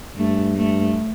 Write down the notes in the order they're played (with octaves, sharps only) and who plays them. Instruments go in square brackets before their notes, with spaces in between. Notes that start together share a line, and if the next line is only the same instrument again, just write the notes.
[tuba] G2 [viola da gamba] A3
[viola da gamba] A3